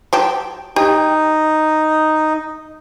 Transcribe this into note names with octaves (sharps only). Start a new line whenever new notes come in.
F#3 G4 A5
D#4 G4